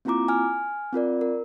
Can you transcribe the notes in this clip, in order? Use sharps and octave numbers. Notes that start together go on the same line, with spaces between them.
A#3 C4 E4 F4 A#5 D6
G#5 F6
C4 F4 A#4 D5
A#4